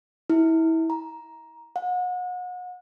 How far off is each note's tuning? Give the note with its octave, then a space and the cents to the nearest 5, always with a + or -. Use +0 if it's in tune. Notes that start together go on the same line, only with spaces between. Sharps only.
E4 -25
A#5 +10
F#5 -35